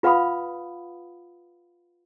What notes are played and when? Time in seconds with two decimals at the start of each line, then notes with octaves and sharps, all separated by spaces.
0.03 F4 B4 F5 F#5 B5 D#6